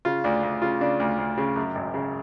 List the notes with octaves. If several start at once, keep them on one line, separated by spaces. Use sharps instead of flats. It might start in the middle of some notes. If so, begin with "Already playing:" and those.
C#3 F4
D2 D4
D2
C#3 F4
C#3 D4
D2
D2
C#3
F#2
G#1
C#3